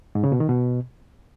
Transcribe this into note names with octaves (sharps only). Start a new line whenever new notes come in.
G#2
C#3
B2
D#3
B2